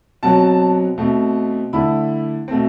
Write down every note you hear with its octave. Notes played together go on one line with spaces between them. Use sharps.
B2 F#3 C4 A5
B2 A3 C4
D3 A3 E4 B5
B2 A3 C4